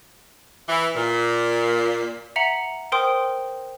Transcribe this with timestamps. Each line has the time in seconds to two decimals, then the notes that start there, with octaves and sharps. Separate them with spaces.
0.69 E3
0.95 A#2
2.36 E5 F#5 A#5 C#7 F#7
2.92 A#4 C5 G5 C6 D#6